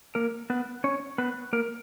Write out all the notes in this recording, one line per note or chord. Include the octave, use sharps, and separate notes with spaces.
A#3 A#4
B3 B4
C#4 C#5
B3 B4
A#3 A#4